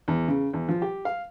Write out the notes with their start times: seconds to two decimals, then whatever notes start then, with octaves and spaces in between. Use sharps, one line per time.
0.08 E2
0.28 C#3
0.53 E2
0.69 F3
0.82 G4
1.05 F5